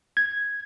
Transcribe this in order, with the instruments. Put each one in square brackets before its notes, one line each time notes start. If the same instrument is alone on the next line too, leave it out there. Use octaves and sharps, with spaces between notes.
[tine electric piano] G#6